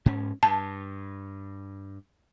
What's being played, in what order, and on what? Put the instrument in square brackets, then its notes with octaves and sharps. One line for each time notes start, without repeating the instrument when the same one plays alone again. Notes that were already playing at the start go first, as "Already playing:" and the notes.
[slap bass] G#2 C#4
[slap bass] G2 [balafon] A5